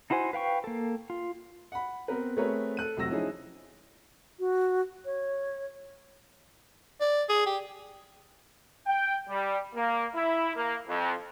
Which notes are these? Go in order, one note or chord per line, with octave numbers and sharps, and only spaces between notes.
D#4 E4 F#4 C5 G#5
B4 F5 G5 C#6
A#3 A4
F4
F#5 B5
B3 C4 A#4 B4
A3 C4 G#4 A#4 B4 C#5
A4 F#6 D#7
F1 C3 F#3 F#4 E6 A#6
F3 C#4 D#4 E4 G#4
F#4
C#5
D5
G#4
G4
G5
G3
A#3
E4
A#3
F2